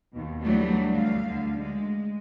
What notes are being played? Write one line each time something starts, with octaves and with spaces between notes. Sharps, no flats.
D#2 B2
E3 F#3 G3 A3 B3 D4
D2 A3 F5
D2 D3
G#3